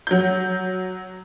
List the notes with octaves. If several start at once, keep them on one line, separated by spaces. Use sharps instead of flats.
F#3 G6